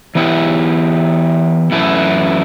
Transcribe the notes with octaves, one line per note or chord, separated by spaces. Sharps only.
E3 B3 E4 G4
F#2 E3 A3 E4